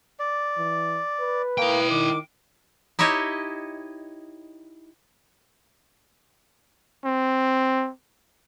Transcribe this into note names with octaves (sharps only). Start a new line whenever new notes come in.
D5
E3
B4
A#3 E4 G5
D#3 D6
D#4 E4 G4 C#5 D#5
C4